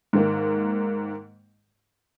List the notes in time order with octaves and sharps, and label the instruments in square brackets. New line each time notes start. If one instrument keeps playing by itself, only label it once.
[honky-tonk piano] G#2 D#3 A#3